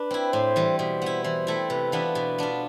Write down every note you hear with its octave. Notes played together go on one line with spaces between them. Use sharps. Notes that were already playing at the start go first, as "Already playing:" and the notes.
Already playing: D4 B4
C4 E4
A2 C5
E3 G3
B2 C5
B3 E4
E3 C5
A3 C4 E4
C3 B4
E3 B3 D4 F4
B2
B3 D4 F4